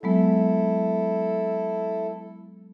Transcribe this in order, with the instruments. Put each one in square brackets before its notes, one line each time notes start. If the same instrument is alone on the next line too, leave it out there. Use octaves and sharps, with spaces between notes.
[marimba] F#3 G#3 B3 [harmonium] E4 A4